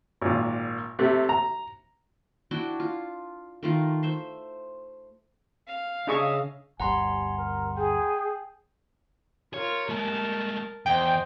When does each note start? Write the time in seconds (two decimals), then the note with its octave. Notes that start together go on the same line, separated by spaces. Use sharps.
0.22 G#1 A#2
0.99 C3 A3
1.29 A#5
2.51 D4 E4 F#4 G5
2.80 F4
3.63 D#3 A3 F4
4.03 C5 E5 C6
5.67 F5
6.07 C#3 D4 G#4 D#5 E5 C#6
6.80 G1 D2 G3 F#5 G#5 A#5 C6
7.38 A#4
7.77 G#4 G5
9.54 F4 A#4 C#5
9.89 G#3 A3 A#4 A5
10.86 E2 C5 D#5 G5